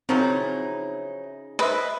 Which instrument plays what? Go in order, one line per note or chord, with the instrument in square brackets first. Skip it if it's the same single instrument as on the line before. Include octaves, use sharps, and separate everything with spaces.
[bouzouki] C#3 D#4 [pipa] F3 F#3 E4 [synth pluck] C4
[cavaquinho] B4 [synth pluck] C5 B5 C6 [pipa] D#5 E5